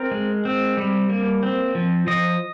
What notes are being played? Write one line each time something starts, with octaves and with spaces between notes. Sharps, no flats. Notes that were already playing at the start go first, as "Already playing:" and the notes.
Already playing: C4 A#4
G#3
C4
G3
A#3
C4
F3
F3 D#5